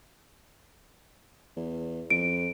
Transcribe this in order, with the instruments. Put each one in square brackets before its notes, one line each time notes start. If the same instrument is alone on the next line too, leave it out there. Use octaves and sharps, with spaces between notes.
[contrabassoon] E2
[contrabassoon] F2 [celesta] D7